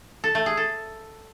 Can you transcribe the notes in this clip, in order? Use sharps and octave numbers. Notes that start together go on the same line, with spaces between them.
A4
A3
G#4
A4